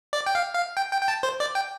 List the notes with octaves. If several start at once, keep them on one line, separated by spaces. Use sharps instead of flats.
D5
G5
F5
F5
G5
G5
G5
A5
C5
D5
G5